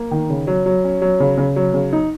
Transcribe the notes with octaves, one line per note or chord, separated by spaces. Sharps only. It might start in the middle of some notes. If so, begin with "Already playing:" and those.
Already playing: A#3
D#3
C#3
F#3
F#3
C#4
F#3
C#3
C#3
F#3
C#3
D#4